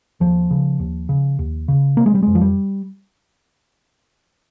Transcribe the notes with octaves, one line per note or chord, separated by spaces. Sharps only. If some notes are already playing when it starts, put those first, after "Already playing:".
D#2 F3
C#3
D#2
C#3
D#2
C#3
C3 A#3
G#3
G3
F2 G#3
F3
G3